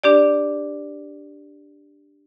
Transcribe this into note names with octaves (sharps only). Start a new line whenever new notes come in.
D4 G4 D5